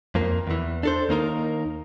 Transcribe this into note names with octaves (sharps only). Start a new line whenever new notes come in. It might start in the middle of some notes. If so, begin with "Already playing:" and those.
F2 A#3
E2 E3
D4 A4 C5
D#2 A#3 D#4 A#4